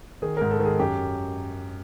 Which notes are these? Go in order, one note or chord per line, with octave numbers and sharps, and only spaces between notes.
D#3 G#4
G#2 A#4
A4
D#3
G#4
F#2 G4